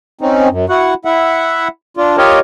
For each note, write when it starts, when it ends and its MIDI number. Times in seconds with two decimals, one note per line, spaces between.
0.21 0.48 60
0.21 0.48 61
0.21 0.48 63
0.50 0.66 42
0.69 0.94 64
0.69 0.94 66
0.69 0.94 78
1.05 1.68 64
1.05 1.68 76
1.05 1.68 78
1.97 2.17 62
1.97 2.17 65
2.17 2.39 65
2.17 2.39 67
2.17 2.39 70
2.17 2.39 73
2.17 2.39 75